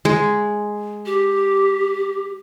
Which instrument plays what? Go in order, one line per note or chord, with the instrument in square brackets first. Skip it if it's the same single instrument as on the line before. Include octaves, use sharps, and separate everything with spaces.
[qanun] G#3
[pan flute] G4